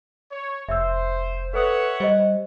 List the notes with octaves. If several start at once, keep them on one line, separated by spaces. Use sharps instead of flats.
C#5
F1 C5 E5 E6
A4 B4 C#5 E5 F#5 D#6
G3 C5 D#5